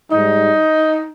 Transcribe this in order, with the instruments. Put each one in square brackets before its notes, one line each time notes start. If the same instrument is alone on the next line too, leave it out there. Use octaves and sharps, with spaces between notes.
[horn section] G#2 G3 D#4